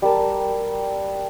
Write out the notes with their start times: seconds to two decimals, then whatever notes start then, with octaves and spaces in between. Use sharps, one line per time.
0.02 G3 A#4 A5